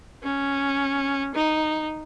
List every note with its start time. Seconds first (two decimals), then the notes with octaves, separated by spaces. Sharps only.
0.23 C#4
1.35 D#4